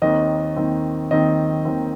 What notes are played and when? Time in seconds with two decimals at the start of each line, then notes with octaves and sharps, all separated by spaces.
0.02 D#2 D#3 C4 D#5
0.56 D#2 D#3 C4
1.11 D#2 D#3 C4 D#5
1.65 D#2 D#3 C4